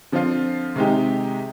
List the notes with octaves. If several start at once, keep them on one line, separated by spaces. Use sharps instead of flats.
D3 F3 C4 F4
C3 D#3 G#3 D#4 G4